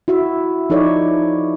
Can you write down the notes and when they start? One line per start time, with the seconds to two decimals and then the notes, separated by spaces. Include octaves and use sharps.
0.08 E4 F#4 E5
0.70 F3 D#4 E4 A4 C#5 D5